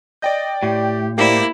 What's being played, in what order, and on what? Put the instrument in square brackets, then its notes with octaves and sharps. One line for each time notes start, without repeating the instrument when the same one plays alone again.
[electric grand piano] D5 G5 G6 [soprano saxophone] D#5
[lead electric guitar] A2 [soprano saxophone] G4
[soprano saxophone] A#3 [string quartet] E4 [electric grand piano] G4 C5 D5